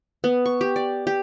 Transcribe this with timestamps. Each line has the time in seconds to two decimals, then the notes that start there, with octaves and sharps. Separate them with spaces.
0.24 B3
0.46 C#6
0.61 G4
0.76 D5
1.07 G4